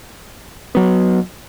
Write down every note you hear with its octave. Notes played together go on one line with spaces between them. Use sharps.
F#3 B3